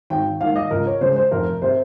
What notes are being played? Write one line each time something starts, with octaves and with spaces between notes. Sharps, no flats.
G#1 G5
G#2 D#3 A#3 F5
D#5
C#2 A#4
C#5
C#3 G#3 C5
C5
F1 A#4
C3 C5